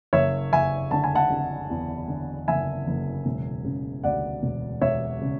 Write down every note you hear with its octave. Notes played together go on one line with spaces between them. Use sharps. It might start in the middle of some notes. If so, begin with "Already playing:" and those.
F#1 C#5 E5
F#1 E5 G#5
D3 A5
G#5
F#5 A5
D3
E2
D3
F#1 E5 G#5
F#1
E1
C#3
D2 D5 F#5
E1
E1 C#5 E5
C#3